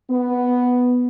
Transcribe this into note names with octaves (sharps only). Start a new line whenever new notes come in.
B3